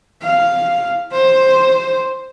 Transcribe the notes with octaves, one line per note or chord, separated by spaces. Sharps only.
F5
C5